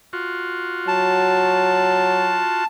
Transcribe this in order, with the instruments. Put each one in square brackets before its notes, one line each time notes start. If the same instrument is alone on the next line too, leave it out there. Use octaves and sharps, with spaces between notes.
[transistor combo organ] F4 F#4
[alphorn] F#3 [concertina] A5